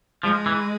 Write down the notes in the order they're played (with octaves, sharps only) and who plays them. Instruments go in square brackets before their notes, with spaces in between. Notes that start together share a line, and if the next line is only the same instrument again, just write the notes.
[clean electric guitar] F3 [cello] G#3
[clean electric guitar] E3